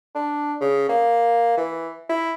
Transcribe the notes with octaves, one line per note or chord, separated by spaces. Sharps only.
D4
C#3
A#3
E3
E4